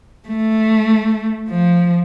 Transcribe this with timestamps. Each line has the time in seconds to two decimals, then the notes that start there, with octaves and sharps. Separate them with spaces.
0.28 A3
1.49 F3